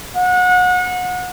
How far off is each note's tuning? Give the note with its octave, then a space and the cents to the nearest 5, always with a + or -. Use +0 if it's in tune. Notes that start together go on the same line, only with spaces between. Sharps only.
F#5 -30